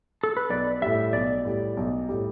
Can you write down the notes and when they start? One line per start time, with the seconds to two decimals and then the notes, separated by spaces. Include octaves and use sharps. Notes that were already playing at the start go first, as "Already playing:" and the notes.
0.23 A4
0.37 B4
0.50 B1 D5
0.82 A2 G3 E5
1.13 B1 D5
1.45 A2 G3
1.77 B1
2.09 A2 G3